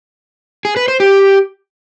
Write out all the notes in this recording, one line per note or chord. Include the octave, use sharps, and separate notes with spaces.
G#4
B4
C5
G4